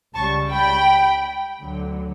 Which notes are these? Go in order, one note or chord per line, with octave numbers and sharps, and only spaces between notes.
C#2 C#3 G3 A5 C#6
G5 B5
D2 D3 F#3